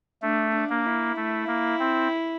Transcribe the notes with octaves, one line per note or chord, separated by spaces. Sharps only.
A3 D4
D4
A#3
E4
A3
A#3
C4